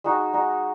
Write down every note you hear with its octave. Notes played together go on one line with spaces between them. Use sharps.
G#3 D#4 F#4
G#3 D#4 F#4